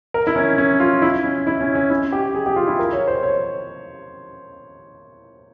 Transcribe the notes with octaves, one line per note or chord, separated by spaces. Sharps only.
A#4
E4
C#4
C#4
F4
E4
C#4
E4
C#4
C#4
E4
G4
G#4
G4
F4
E4
A#4
C#5
C5
C#5